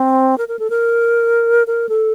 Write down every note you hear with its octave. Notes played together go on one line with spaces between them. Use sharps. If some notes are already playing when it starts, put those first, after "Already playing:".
Already playing: C4
A#4
A#4
A4
A#4
A#4
A4